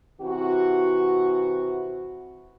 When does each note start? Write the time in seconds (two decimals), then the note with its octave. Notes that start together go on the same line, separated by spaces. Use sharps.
0.21 C3 E3 E4 F#4